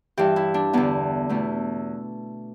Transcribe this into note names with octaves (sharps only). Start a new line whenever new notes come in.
G2 E3 G4
E4
D4
E2 D3 B3
E2 B2 A3